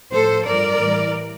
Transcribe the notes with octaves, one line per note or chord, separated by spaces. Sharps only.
A2 F3 A4 C5
G2 F3 A#4 D5
A2 E3 G3